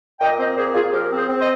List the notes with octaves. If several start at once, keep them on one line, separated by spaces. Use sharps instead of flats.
A#2 D#5 G5
C4 C5 D#5
A#2 G#4 C5
A#2 F4 G#4
F3 G4 A#4
C4
G#4 C5
C4
C5 D#5